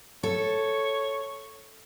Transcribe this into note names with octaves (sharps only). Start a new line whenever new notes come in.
A4 C#5